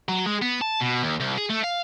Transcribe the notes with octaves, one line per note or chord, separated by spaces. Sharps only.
F#3
G#3
B3
A5
B2
D#2
C2
G#4
A3
F5